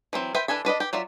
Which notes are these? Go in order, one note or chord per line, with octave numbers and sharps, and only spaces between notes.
E3 F#3 C4
B4 C5 E5 G5
E3 D4 A4 G#5 B5
D4 B4 D5 D#5
G4
F#3 F4 D5 E5